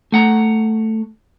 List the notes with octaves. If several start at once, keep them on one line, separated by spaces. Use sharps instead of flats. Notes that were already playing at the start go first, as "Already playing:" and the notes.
A3 F#5 A#5